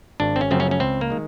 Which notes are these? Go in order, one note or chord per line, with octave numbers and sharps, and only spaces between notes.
G#1 D4
C4
C#4
F#2 C#3 F3 A3 C4
C#4
C#4
C#2 C4
A#3
D#3 G#3